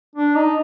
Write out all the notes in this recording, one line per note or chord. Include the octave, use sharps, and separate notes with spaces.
D4
D#4